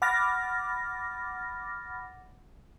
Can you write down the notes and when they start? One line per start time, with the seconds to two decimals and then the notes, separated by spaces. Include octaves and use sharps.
0.02 F#5 B5 D6 F6 A6 A#6